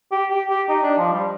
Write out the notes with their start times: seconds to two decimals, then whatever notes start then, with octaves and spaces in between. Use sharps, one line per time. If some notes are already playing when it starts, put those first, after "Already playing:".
0.11 G4
0.30 G4
0.50 G4
0.69 D#4
0.83 D4
0.98 F3
1.13 G3